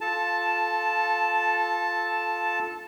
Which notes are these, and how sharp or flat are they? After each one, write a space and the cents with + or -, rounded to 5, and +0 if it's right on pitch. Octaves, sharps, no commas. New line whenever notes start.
F4 +0 A4 -15 A5 +0